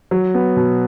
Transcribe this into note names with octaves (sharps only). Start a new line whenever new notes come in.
F#3
B3
B2